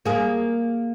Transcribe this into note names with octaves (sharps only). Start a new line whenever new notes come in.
A#3 G#4